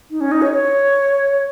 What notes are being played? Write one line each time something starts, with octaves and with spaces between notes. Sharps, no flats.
D#4
C#4
D#4
C#5
C#5